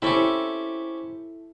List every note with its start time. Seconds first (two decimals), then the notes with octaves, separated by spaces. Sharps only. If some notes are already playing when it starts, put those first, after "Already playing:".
0.02 C4 C#4 E4 G4 A4